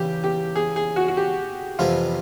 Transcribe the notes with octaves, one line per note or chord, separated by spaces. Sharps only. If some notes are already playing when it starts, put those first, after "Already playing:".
Already playing: E2 C#3 E3 G3 G4
G4
G#4
G#4
F#4
F#4
G4
F2 C3 E3 G3 B3 F4